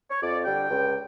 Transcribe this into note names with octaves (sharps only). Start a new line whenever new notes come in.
C#5
F2 D5
D3 G3 G5
C#2